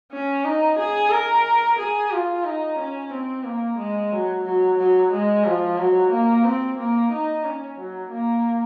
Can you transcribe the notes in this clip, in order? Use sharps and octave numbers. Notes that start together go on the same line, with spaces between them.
C#4
D#4
G#4
A#4
G#4
F4
D#4
C#4
C4
A#3
G#3
F#3
F#3
F#3
G#3
F3
F#3
A#3
C4
A#3
D#4
C#4
F#3
A#3